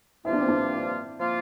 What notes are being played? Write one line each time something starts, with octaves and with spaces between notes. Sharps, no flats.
G2 F3 A#3 E4 F4
D4
C4
D4
F3 A#3 F4